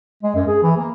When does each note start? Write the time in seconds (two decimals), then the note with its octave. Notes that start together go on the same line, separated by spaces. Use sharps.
0.23 G#3
0.35 F#2
0.48 G#4
0.63 E3
0.77 A#3